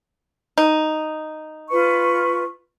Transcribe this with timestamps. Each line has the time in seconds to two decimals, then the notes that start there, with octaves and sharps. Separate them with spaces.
0.58 D#4
1.70 F4 B4 C#6